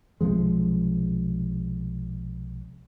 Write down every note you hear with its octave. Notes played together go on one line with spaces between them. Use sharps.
B1 C3 F3 G#3